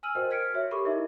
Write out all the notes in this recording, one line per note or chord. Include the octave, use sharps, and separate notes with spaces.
G#5 E6 F6 D#7 F#7
F#4 A#4 C5 D#5 G5
F6 G#6 B6 C#7 D7
F#4 C#5 E5
G4 A4 A#4 B5 C#6 D6
D#4 E4 A#4 D#5 E5